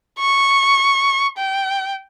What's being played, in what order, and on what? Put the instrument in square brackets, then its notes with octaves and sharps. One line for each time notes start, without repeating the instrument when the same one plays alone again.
[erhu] C#6
G5